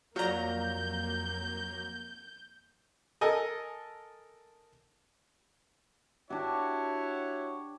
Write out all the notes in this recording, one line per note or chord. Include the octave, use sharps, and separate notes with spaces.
F2 F#3 A#3 F4 D5 A#5 G6
A4 A#4 D#5 G#5
D4 E4 F#4 G4 C#5